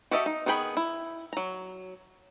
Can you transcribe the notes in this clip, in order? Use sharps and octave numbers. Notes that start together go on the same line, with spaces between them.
F#4 G4 A4 D#5 E5
D#4
D#3 B3 G#4 G5 B5
E4
F#3 A#5